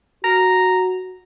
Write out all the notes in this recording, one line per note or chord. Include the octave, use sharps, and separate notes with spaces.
F#4 A#5